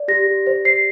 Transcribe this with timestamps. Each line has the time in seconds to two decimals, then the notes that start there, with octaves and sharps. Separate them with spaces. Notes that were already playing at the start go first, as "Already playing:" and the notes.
Already playing: D5
0.08 G4 A#6
0.27 G4
0.47 C5
0.65 C5 C7